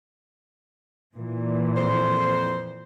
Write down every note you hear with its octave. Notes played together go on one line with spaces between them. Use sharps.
A#2 E3
F2 C5